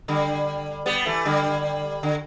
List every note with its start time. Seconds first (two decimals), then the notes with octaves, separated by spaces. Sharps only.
0.08 D3 G3
0.86 G3 B3
1.06 E3 A3
1.25 D3 G3
2.03 D3